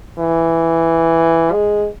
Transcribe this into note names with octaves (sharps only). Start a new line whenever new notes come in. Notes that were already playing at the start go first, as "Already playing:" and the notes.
E3
G#3